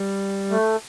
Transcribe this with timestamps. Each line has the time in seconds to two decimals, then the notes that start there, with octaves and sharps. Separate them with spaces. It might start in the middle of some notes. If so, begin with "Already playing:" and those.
Already playing: G3
0.51 A3